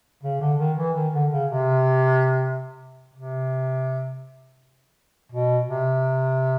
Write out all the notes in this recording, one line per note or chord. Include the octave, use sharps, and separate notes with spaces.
C#3
D3
D#3
E3
D#3
D3
C#3
C3
C3
B2
C3